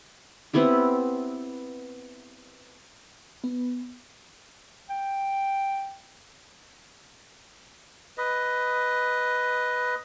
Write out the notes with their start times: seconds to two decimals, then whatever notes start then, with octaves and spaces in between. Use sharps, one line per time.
0.53 B3 C4 E4 G4
3.44 B3
4.90 G5
8.18 B4 D#5